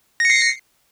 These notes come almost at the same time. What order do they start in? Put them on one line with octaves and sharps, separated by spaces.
A#6 C#7 C7